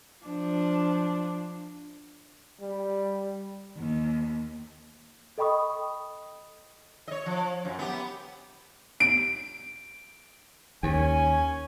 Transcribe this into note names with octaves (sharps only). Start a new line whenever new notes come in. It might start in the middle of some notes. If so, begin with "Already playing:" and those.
F3 D4
G3
D#2
A4 D#5 G5 B5 C#6 D#6
C#5 D#5
F3
F#2
B3 G4
D7
D#2 C#4 G#5